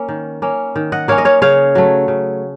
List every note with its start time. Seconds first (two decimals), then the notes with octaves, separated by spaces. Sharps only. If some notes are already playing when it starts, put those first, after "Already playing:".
Already playing: A#3 C#4
0.09 D#3
0.42 A#3 C#4
0.76 D#3
0.92 D#5 F#5
1.08 A#3 C#4 C#5 F5
1.18 D#5
1.25 C#5 F5
1.42 C#3 C#5 F5
1.75 F#3 A3
2.08 C#3